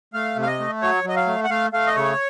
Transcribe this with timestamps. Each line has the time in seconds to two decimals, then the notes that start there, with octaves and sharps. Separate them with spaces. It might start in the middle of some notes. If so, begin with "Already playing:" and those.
0.13 A3 F5
0.36 C3
0.42 F5
0.47 D#5
0.59 A3
0.82 F#3 C#5
1.04 F#3 D#5
1.16 F5
1.27 A3
1.44 F#5
1.50 A3 F5
1.72 A3 F5
1.87 D#5
1.96 C#3 C#5